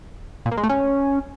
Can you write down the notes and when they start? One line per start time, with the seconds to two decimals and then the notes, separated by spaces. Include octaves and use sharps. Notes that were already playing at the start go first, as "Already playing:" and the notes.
0.45 A#2
0.51 A#3
0.57 G#3
0.63 A3
0.69 C#4